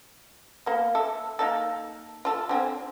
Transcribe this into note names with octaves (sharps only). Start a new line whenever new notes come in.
A#3 B3
A4 E5
A#3 D#4 A4
F4 A4
D3 C4 G#5